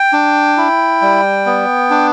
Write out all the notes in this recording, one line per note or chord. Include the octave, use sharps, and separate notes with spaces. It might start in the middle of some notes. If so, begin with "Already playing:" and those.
Already playing: G5
D4
E4
G3
B3
D4